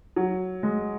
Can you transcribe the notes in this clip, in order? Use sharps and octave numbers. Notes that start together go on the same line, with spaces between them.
F#3
G#3